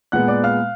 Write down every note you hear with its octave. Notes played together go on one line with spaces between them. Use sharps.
A#2 G#3 B3 F#5 F#6
D5 D6
F5 F6